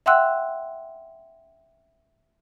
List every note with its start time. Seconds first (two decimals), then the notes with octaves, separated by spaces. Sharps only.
0.06 E5 F#5 G5 C6 E6 F#6